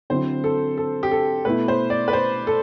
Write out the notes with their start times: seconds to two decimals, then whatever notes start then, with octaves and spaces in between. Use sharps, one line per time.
0.10 D3 F#3 C4 E4 C5
0.44 A4
0.78 A4
1.03 G4
1.11 A4
1.45 B2 A3 E4 B4
1.68 C5
1.90 D5
2.08 B4
2.13 C5
2.47 A4